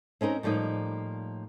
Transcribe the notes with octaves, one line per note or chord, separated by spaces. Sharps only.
C4 C#4 D#4 A#4
A2 F3 G3 A#3 D#4